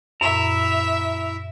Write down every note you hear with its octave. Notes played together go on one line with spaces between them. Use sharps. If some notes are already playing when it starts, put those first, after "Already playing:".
F#2 A#2 E4 E5 A#5